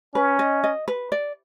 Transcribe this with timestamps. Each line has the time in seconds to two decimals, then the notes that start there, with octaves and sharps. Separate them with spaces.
0.15 C#4 B4
0.39 D#5
0.64 D#5
0.88 B4
1.12 D5